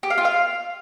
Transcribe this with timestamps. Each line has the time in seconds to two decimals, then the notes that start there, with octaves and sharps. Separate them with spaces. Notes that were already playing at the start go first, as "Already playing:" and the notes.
0.03 G4
0.10 F5
0.18 F4
0.25 F5